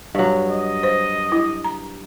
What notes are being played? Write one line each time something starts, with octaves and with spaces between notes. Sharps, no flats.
G2 F#3
D#5
C5
E4
A#5